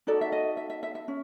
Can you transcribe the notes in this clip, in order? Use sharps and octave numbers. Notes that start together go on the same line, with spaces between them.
D#4 F#4 A4 D5
E5
D#5
E5
E5
E5
E5
C#4